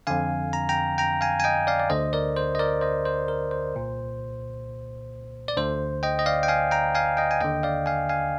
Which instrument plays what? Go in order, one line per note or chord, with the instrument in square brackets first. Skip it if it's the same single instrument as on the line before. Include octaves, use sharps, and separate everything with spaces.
[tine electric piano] F2 D3 F5 G#5
A#5
G5 A#5
G5 A#5
F5 G#5
G#5
D#5 G5
D5 F5
D5
D2 D3 C5 D#5
A#4 D5
C5
D#5
A#4 D5
C5 D#5
C5
A#4
C5
C2 A#2
D5
D2 D3 C5
D#5 G5
D#5
D5 F5
G5
F5 G#5
G5 A#5
F5 G#5
D#5 G5
G#5
D#2 D3 D#5 G5
D5 F5
F5 G#5
F5 G#5